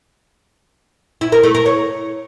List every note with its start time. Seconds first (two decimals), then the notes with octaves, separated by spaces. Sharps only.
1.21 E4
1.32 A#4
1.43 A3
1.55 A#4
1.66 C#5